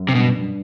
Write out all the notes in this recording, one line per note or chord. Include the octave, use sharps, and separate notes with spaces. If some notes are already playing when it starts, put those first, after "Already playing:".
Already playing: F#2
C3
G2 B2
G2